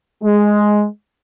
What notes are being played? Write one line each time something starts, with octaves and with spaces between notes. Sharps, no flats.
G#3